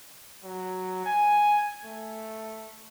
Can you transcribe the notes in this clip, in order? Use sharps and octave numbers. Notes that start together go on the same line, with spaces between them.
F#3
G#5
A3